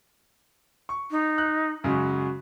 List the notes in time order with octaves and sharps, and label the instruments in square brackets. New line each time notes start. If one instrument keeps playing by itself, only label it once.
[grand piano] C#6
[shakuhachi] D#4
[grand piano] F#6
[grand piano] F#2 C#3 G#3 [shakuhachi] F#4